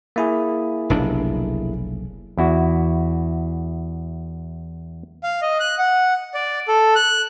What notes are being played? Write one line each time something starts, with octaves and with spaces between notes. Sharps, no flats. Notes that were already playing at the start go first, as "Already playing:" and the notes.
A#3 E4 G#4
F1 B1 D4
E2 E4 F#4
F5
D#5
F#6
F#5
D5
A4
F#6